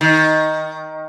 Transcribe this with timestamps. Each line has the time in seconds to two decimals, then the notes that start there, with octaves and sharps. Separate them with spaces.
0.01 D#3